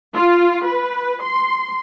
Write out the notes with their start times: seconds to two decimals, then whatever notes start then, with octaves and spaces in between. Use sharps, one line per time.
0.15 F4
0.66 B4
1.24 C6